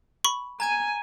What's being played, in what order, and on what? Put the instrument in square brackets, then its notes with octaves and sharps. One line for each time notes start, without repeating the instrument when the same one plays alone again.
[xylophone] B5 C#6
[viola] G#5 [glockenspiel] A#5 G#6 D#7